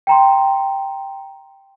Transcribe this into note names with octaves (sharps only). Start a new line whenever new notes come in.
G5 A#5 C6